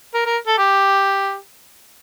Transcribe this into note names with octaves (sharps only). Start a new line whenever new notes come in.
A#4
A#4
A4
G4